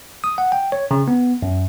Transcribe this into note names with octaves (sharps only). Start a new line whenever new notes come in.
D#6
F#5
G5
C#5
C#3
B3
F#2